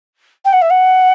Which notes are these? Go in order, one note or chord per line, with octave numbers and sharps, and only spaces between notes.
G5
F#5
E5
F#5